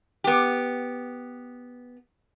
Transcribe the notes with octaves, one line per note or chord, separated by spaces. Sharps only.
B3 G4